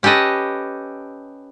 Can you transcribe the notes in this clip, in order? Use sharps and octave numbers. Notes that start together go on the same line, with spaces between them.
C#4 G4 A4 B4 D#5